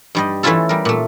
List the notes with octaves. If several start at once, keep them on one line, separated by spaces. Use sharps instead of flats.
G2 G3 D#5
E3 A3 C#4 E4 F4 A4
G3 A#4
A#2 A3